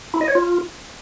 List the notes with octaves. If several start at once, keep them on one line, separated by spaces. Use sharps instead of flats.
E4
D#5
C#5
F4